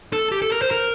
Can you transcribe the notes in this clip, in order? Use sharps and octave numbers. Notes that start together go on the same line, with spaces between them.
A4
G4
A4
A#4
C5
A#4